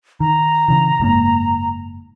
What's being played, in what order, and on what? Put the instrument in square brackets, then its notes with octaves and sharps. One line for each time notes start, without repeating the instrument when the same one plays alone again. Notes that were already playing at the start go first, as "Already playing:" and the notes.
[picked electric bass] D#3 [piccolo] A#5
[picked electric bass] C#3 E3
F#1 G#2 A#3